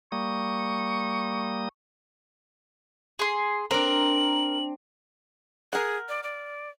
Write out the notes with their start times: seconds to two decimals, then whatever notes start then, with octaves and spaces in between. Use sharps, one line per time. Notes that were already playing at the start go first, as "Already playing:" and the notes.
0.12 G3 A#3 C#6 D#6
3.19 G#4 C6
3.71 C4 D4 A#4 F#7
5.73 G#4 A#4 F#5
6.09 D5
6.23 D5